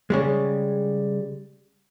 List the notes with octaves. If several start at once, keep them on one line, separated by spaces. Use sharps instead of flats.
C#3 G3 G#3